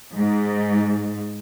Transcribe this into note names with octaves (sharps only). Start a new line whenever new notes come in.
G#2